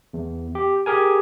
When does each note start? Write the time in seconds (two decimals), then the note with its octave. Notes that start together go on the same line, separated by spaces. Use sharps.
0.13 E2
0.55 G4
0.86 G4 G#4 A#4 G#5